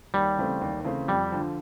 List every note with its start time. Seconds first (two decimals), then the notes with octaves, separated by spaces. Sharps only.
0.14 D#2 G3
0.37 C#3 E3 A3 C4
0.61 D#2
0.84 C#3 E3 A3 C4
1.08 F2 G3
1.32 D3 F3